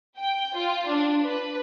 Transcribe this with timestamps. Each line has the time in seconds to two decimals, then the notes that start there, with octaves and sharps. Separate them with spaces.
0.19 G5
0.57 F4
0.89 D4
1.24 B4